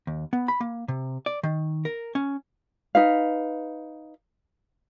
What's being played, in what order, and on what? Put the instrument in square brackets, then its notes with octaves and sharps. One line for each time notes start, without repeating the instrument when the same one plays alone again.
[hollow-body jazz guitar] D#2
B3
B5
A#3
C3
D5
D#3
A#4
C#4
[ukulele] D#4 B4 F5